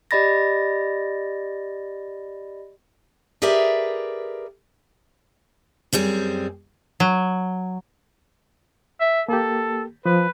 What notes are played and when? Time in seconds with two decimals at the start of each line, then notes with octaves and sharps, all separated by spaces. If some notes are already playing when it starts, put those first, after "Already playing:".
0.11 G4 D5 D#5 B5 A6 A#6
3.42 G4 G#4 A#4 B4 D5 E5
5.93 F#2 G3 C4 G#4
7.00 F#3
9.01 E5
9.29 A#3 G4 A4
10.06 F3 B4